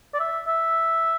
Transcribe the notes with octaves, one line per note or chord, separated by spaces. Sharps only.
D5
E5
E5